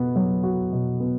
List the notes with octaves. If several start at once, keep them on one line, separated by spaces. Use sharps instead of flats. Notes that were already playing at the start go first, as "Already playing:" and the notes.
Already playing: B2 B3
F#3
F#4
B2
B3